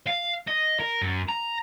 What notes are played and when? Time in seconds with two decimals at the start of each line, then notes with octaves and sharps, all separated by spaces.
0.07 F5
0.48 D#5
0.80 A#4
1.01 F#2
1.29 A#5